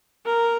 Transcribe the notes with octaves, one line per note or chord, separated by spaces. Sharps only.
A#4